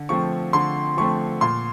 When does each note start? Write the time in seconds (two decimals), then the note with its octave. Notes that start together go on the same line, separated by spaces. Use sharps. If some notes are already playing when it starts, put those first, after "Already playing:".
Already playing: D3
0.09 F3 A3 C4 C#6
0.53 D3 C6
0.97 F3 A3 C4 C#6
1.41 A#2 C6